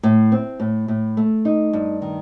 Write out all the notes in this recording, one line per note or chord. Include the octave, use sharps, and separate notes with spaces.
A2
C4
A2
A2
A3
D#4
G2
D#3